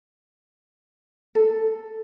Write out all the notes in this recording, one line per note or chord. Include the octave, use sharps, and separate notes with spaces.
A4